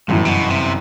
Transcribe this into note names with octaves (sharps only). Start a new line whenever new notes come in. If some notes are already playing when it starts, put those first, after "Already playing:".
G1 F#2 A2 E3
C3
B2
C3